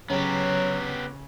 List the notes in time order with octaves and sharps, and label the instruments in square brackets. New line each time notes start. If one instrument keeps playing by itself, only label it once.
[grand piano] C#3 C#4 [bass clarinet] F#3 [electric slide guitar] B3 G4